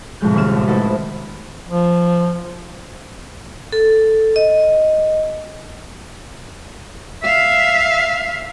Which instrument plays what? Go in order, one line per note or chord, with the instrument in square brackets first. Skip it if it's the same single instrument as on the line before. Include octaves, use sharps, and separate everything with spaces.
[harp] C2 F2 A2 G#3 G6
D#1 D#2 G#4 F6 E7
A1
D#4 E4 F#4 A4 B4
C5
[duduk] F3
[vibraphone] A4
D#5
[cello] E5 F5